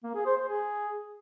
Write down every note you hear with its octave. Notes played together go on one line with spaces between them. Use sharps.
A#3
G#4
C5
C5
G#4